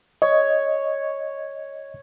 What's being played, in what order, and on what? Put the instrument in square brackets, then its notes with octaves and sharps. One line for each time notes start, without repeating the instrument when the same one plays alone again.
[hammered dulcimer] C#5 [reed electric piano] D#5